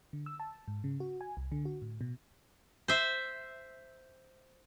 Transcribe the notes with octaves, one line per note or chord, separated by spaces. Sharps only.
D3
E6
A5
G#2
C#3
F#4
G#5
C2
D3
F#4
A2
B2
C5 E5